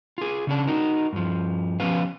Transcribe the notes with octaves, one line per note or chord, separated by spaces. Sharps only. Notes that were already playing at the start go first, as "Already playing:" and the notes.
F4 G#4
C#3 C#4 D4
D#4 F#4 A#4
G2 F3
B2 F3 C#4 B4 F5